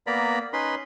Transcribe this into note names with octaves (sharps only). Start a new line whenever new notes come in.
A#3 B3 D5 A#5 B5
C#4 D#4 B4 B5 C6